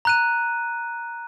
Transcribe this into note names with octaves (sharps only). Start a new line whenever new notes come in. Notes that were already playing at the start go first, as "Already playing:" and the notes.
A#5 F#6 D#7